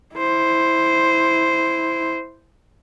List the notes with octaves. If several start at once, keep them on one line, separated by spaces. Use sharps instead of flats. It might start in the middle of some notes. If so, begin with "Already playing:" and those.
E4 C5